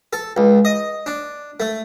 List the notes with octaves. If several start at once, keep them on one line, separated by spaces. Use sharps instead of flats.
A4
C#2
D#5
D4
A3